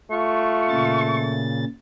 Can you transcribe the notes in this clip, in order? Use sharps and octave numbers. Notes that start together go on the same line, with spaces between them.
A3 F4 C#6
A#2 C#3 A6